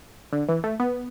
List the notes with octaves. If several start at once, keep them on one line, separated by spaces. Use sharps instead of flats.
D3
E3
A3
B3